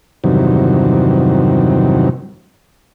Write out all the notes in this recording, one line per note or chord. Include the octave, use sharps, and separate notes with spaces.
E2 G2 C3 D#3 F#3